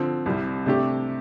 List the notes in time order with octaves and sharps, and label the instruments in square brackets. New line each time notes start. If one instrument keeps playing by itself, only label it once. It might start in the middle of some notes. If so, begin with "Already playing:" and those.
Already playing: [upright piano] D3 F3 C4
C2 C3 G3
C3 A3 D4 G4